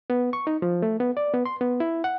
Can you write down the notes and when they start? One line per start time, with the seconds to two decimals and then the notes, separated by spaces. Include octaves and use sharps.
0.10 B3
0.33 C#6
0.47 D#4
0.62 F3
0.82 A3
1.00 B3
1.17 D5
1.34 B3
1.46 C6
1.61 B3
1.80 E4
2.04 F#5